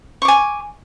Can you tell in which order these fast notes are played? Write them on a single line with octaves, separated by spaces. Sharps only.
C#6 D6 G#5